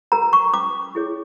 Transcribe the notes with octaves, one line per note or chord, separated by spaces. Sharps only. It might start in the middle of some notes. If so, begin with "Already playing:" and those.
G4 A#4 A#5
C#6
C#4 D6
E4 G#4 C#5